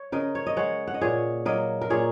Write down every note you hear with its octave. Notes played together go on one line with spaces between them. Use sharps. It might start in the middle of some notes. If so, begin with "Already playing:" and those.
Already playing: C#5
C#3 A#4 D#5
C#5
D#5
G#3 C#5 F#5
F#5
D#5
A#2 G#4 C#5
F#3 A#3 A#4 D#5
A#4
A#2 G#4 C#5